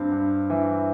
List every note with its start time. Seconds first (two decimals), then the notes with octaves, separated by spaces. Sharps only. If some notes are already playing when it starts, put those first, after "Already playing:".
Already playing: G2 C4
0.12 G2
0.50 E3